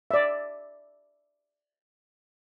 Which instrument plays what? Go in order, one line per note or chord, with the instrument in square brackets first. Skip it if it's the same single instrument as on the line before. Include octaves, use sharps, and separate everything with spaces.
[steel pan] D5 E5